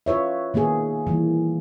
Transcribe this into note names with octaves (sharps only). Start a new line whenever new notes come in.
F4 B4 C#5 E5
D#3 A#3 B3 G#4
E3 G3 A#3